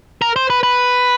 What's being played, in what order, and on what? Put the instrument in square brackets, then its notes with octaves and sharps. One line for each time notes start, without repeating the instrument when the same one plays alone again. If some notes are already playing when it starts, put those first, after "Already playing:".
[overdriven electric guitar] A#4
C5
B4
B4